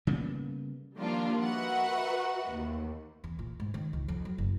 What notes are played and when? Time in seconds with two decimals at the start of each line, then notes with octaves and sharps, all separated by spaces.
0.07 C#3 G3 A#3 B3
0.97 D#3 F3 G3 A#3 D4 F4
1.43 F#4 A#4 B4 D#5 E5 F#5
2.53 D#2
3.24 E2
3.39 A#2
3.60 G#2
3.74 D#3
3.93 C#2
4.08 F2
4.25 F#3
4.38 F#1